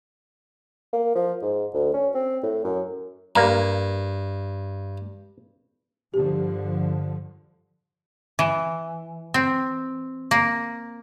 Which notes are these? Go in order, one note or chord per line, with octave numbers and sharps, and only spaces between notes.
A#3
F3
G#2
D2
C#4
C4
A2
F#2
G2 A#3 A#5
G2 D3 F3 G4
E3
C4
A#3